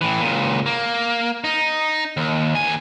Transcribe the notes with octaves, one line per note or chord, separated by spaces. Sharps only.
A2 E3
C#2 A#2
A#3
D#4
D#2
D#2 G#5